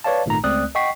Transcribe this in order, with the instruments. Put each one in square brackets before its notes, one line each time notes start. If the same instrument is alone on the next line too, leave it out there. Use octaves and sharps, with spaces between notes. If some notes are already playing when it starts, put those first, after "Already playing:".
[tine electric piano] B4 C#5 D5 F5 A5
G#1 A#2 A3 D#4 A#5
C#2 A3 C4 D5 D#6 F#6
D#5 F#5 G5 C#6 B6 C7